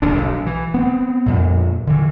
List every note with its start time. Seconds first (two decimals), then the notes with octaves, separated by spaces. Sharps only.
0.02 D#1 A#1 D3 D4
0.18 B1
0.46 E3
0.74 B3 C4
1.26 F2 A#2
1.87 D3 E3